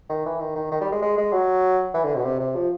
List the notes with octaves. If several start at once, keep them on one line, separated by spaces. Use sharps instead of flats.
D#3
E3
D#3
D#3
D#3
G3
G#3
G#3
G#3
F#3
E3
D3
B2
C3
C3
F3